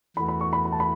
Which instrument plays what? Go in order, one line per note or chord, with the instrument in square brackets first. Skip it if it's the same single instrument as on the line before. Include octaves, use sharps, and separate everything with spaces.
[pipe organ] E2 E3 A3 F#4 [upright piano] B5
[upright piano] B5
C#6
B5
B5
A5
B5